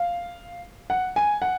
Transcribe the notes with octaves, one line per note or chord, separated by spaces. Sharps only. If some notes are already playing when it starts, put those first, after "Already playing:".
Already playing: F5
F#5
G#5
F#5